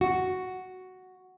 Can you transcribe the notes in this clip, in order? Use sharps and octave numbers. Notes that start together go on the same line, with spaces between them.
F#4